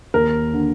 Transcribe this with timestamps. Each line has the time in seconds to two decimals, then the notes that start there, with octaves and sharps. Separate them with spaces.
0.14 D#2 A#4
0.53 D3